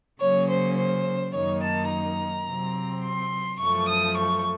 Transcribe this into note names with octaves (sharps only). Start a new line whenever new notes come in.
C#3 F#3 A#3 C#4 C#5
C5
C5
F#2 D#3 A#3 D#4 C#5
A5
A#5
C3 F#3 C4
C6
F#2 F3 A3 C#6
D#6
C#6